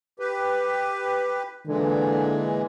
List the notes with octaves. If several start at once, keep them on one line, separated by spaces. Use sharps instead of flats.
G4 B4
A#2 D3 E3 G#3